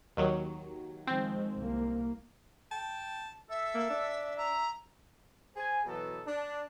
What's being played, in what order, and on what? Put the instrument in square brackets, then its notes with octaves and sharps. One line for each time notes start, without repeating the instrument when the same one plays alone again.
[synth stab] D#2 D#3 F#3
[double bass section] D#3 F3 G#3 [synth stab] C4
[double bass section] C2 A#3
[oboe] G5 [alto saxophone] A5
[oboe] A4 [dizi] E5
[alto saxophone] A#3
D4
[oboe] E5 [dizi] A#5
[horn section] G#4 C5 G#5
B2 E3 F#3 B3 A4
D4